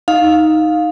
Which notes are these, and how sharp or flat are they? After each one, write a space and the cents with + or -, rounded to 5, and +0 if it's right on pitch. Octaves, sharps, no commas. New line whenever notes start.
D#4 +5 F5 +15